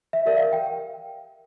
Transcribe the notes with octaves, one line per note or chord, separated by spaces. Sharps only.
E5
G4 A#4 D5 E5
F5
G5